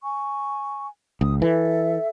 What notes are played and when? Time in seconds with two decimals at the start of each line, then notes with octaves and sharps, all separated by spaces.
0.03 G#5 C#6
1.21 C#2 D#6
1.42 E3 A4 E5